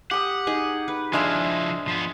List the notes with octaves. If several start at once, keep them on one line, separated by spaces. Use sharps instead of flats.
G4 F#5 D#6
D#4 G#4 G#5
B4
F3 G#3 D4 E4 G#4 E5 F5
F3 B3